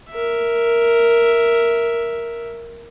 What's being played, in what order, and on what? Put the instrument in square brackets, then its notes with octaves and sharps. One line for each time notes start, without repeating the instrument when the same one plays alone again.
[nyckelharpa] A#4 E5